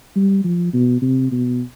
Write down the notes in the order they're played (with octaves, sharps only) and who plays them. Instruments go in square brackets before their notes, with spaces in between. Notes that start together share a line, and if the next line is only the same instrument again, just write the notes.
[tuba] G3
F3
B2
C3
B2